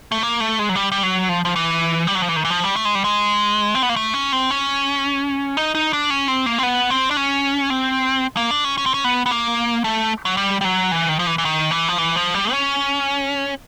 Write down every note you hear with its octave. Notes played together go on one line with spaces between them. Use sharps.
A3
A#3
A3
G#3
F#3
G3
G3
F#3
F3
F3
E3
G3
F#3
F3
E3
D#3
E3
F3
G3
A3
G#3
G3
G#3
C4
B3
A#3
A3
C#4
C4
C#4
D#4
D#4
D4
C#4
C4
A#3
C4
B3
C4
D4
C#4
C4
A#3
D4
C#4
C#4
C4
C#4
B3
B3
A#3
A3
F#3
G3
G3
F#3
E3
D#3
F3
E3
E3
D#3
E3
F3
E3
F3
G3
C#4